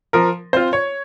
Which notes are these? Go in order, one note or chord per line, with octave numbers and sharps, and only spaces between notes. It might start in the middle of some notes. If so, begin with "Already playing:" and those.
F3 A#4
C4 F4 C5
C#5